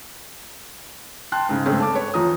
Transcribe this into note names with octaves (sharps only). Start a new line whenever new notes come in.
G5 A5 C6 F#6
G#2 C#3
G2 C#3 G#3 A3 C4 C#4
A5 D6
B4 C#5
E2 F3 A#5 D#6